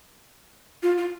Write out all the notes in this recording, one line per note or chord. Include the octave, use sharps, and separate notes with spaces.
F4
F4